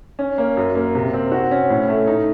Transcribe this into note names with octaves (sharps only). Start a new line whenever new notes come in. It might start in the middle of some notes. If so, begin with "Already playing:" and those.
C#4
A#3
F#2
A#3
C3
C4
F#4
C#4
A2
A3
D#4